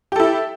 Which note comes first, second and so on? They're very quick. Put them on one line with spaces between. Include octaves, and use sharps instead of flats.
G4 A4 E4